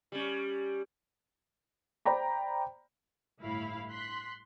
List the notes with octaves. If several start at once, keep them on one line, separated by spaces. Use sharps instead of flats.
G3 C#4
C5 D5 G5 A#5 B5
G1 A2 E4 F5 B5
C6 F#6 B6